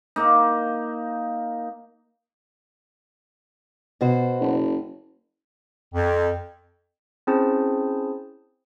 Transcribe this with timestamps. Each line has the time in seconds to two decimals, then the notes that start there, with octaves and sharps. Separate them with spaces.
0.16 A#3 D#4
4.01 B2 F#4 C5
4.40 F#1
5.95 F2
7.27 C4 C#4 E4 G#4 C5 A5